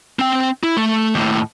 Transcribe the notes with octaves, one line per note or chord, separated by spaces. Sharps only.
C4 G5
E4
A3
D#2 A2